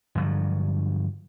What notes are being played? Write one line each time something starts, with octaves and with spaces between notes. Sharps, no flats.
G2 D3 F3 F#3